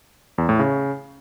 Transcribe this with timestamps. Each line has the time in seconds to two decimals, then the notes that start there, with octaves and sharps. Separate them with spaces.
0.38 E2
0.49 A2
0.59 C#3